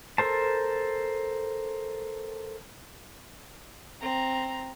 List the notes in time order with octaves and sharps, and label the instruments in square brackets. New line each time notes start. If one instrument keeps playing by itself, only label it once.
[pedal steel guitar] A4 A#4 C5 A5
[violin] C4 A#5